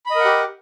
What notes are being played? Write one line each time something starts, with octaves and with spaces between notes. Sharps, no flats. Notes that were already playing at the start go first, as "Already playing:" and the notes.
G4 A#4 D#5 F#5 B5